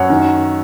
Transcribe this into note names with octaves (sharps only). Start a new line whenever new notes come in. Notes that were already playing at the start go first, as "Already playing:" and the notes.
Already playing: F#2 C#5 F#5
D#3